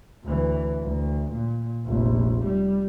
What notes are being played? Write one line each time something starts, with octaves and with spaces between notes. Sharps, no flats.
D2 E3
D2
A#2
F1 A#1
G3